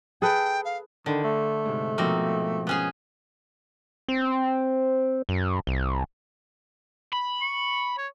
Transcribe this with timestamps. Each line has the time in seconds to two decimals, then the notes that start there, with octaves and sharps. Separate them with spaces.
0.22 G#4 A4 B4 G5
0.65 F5
1.06 D3 D#3 D5 G5 B5
1.24 A3
1.65 G#2 C3
1.98 B2 F3 A#3 C4 D#4
2.67 B3 C#4 G#4
4.08 C4
5.29 F#2
5.67 C2
7.13 B5
7.41 C#6
7.98 C#5